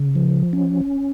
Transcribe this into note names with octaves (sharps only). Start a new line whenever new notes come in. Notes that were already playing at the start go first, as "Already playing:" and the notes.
Already playing: C#3
F3
C#4